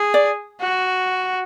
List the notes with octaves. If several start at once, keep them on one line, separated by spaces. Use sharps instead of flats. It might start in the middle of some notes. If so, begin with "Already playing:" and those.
Already playing: G#4
D5
F#4